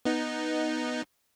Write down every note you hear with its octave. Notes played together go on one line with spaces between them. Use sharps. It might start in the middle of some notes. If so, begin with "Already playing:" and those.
B3 D#4